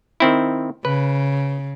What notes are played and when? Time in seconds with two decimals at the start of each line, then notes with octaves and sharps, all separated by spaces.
0.20 D#3 C4 E4
0.85 C#3 B4